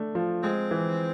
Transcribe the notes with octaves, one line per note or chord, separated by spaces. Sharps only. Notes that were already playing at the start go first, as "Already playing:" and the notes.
Already playing: A3 D4
F3
G#3 C4
E3